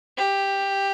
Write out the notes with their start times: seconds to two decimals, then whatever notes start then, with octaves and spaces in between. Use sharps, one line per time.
0.17 G4